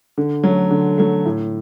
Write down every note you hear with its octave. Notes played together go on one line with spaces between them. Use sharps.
D3
F#3 A3
D3
F#3 A3
A2